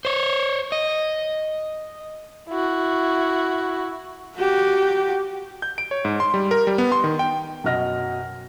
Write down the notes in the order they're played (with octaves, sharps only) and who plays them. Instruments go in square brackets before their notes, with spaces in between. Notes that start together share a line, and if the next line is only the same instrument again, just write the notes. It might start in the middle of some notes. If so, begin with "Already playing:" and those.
[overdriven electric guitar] C5 C#5
D#5
[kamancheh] E4 F#4
[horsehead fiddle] F#4 G4
[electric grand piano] G6
D7
C#5
G#2
C6
G3
A#4
G3
B3
C6
D#3
G5
[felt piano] F#2 B2 F#3 D#5 F6 A#6